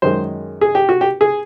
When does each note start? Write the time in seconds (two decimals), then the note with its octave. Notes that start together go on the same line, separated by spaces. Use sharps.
0.02 F#2 D#3 G#3 C5
0.61 G#4
0.75 G4
0.89 F#4
1.01 G4
1.21 G#4